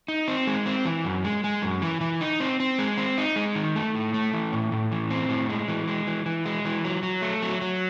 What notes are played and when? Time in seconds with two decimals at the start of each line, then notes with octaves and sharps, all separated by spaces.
0.08 D#4
0.28 C4
0.47 G#3
0.66 C4
0.85 E3
1.05 F#2
1.24 G#3
1.44 G#3
1.62 F#2
1.82 E3
2.01 E3
2.21 D#4
2.40 C4
2.60 C4
2.79 G#3
2.98 C4
3.18 D#4
3.36 G#3
3.55 D#3
3.76 A3
3.95 A2
4.14 A3
4.33 E3
4.52 A2
4.72 A2
4.92 E3
5.10 C4
5.29 A2
5.49 G#3
5.68 E3
5.88 G#3
6.07 E3
6.26 E3
6.46 G#3
6.65 E3
6.85 F#3
7.03 F#3
7.22 A3
7.42 F#3
7.61 F#3